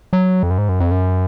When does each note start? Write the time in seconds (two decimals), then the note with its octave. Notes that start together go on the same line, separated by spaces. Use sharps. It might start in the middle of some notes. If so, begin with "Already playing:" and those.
0.13 F#3
0.43 F2
0.51 F#2
0.58 G#2
0.69 F#2
0.80 F2
0.91 F#2